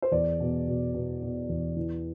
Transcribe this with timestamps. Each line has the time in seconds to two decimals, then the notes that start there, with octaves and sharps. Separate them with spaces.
0.02 C5
0.12 E2 D5
0.40 B2
0.67 B2
0.94 B2
1.22 B2
1.49 E2
1.77 E3